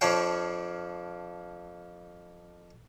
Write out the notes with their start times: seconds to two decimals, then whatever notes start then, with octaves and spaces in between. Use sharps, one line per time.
0.01 F2 F3 D4 C#5 F5 G5